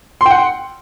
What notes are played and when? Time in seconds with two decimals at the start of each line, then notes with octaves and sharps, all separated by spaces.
0.21 C6
0.26 G5
0.31 F#5